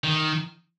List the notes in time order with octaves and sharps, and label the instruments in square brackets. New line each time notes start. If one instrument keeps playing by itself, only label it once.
[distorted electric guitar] D#3